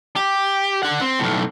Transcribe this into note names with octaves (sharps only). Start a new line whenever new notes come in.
G4
D4 F#5
C4
B1 A2